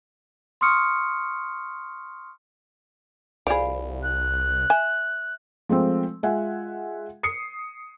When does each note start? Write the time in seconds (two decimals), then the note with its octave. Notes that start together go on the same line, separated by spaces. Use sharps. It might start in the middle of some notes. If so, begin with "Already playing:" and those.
0.61 C6 C#6 D#6 F6 C#7
3.47 C2 F3 G#4 D5 F5 B5
4.03 F#6
4.70 E5 G#5
5.69 F3 G#3 A3 C4
6.23 G#3 F4 E5 F#5 G#5
7.23 D#6 C7 C#7